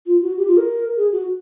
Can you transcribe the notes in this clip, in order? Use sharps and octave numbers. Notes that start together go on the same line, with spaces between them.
F4
F#4
G4
F4
A#4
G#4
F#4